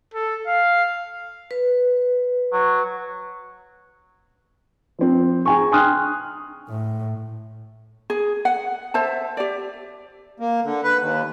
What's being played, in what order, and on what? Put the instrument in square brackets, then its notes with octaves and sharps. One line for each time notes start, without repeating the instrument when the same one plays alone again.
[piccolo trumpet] A4
F5
[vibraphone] B4
[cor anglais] F#3
[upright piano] F3 C4
G#4 G#5 A#5 C#6
G5 G#5 C6 D#6 F6 F#6
[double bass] A2
[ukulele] G#4
F#5
C5 E5 A5
G4 D5
[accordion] A#3
D3
B4
D#2